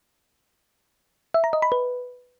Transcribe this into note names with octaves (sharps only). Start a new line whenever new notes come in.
E5
A#5
D#5
B5
B4